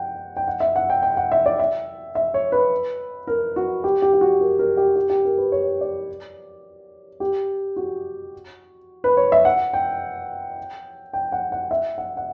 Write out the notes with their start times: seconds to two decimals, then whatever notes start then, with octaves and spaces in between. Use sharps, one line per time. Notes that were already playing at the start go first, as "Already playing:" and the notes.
Already playing: F#5 G5
0.37 G5
0.47 F#5
0.60 E5
0.76 F#5
0.90 G5
1.02 G5
1.17 F#5
1.32 E5
1.46 D5
1.59 E5
2.15 E5
2.34 C#5
2.52 B4
3.27 A#4
3.56 F#4
3.84 G4
4.02 G4
4.14 G4
4.21 F#4
4.41 A#4
4.59 A#4
4.77 G4
4.96 G4
5.10 G4
5.25 A#4
5.38 B4
5.52 C#5
5.81 D5
7.20 G4
7.76 F#4
9.04 B4
9.17 C#5
9.32 E5
9.45 F#5
9.73 G5
11.13 G5
11.32 F#5
11.52 F#5
11.71 E5
11.98 F#5
12.17 F#5